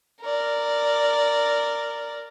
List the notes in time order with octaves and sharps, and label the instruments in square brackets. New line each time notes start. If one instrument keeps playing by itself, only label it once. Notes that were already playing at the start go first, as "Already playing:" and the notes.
[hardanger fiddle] A#4 D5